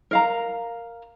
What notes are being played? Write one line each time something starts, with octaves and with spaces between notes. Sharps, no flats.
A#4 F5 A#5